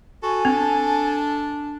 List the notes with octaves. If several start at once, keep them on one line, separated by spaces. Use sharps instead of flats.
F#4 A4 G#5
C4 D4